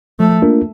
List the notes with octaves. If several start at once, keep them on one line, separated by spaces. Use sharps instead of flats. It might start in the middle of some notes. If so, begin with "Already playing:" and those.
F3 A3
A#3 D4 F4 A#4